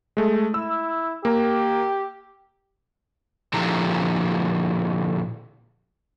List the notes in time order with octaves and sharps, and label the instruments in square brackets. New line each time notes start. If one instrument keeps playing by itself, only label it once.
[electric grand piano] G#3 A3
[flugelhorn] E4 [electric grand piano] E6
[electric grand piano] A#3 A#5 [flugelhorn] G4
[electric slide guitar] A#2 D3 F3 E4 G4 A#5